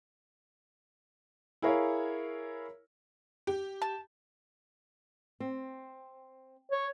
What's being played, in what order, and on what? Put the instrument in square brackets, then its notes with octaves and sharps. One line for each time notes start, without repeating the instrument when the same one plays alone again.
[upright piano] E4 G#4 A#4 C#5 F5
[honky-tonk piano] G4
[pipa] A5
[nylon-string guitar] C4
[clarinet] C#5